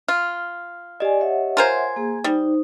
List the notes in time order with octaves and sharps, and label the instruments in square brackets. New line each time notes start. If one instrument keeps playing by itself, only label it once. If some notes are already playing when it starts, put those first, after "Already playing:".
[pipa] F4 [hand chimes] F6
[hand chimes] G4 D#5 [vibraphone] D5 G#5
[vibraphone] C#5 E5 F#5
[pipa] F4 A#4 C5 [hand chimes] G#5 G#6
[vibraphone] A#3 G#4
[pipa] G3 [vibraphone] D#4 C5